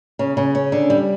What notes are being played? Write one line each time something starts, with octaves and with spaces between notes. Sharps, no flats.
C#3
C#3
C#4
D3
G3